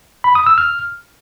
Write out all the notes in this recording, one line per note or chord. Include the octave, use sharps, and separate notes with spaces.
B5
D#6
E6
F6